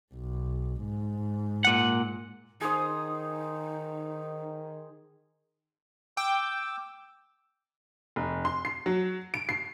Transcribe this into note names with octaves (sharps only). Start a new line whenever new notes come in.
B1
G#2
A#2 F#5
D#3 D#4 G#4 C5 D#6
G5 D6 E6
F1
C6
C7
F#3
D7
C7